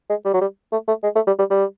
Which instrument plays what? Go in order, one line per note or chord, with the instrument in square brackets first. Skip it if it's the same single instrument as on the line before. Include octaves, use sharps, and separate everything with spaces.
[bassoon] G#3
G3
F#3
G3
A3
A3
G#3
A3
G3
G3
G3